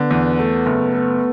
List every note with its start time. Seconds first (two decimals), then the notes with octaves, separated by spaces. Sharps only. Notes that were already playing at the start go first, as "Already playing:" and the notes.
Already playing: D3 B3
0.11 E2
0.39 A3
0.66 F#1
0.94 A3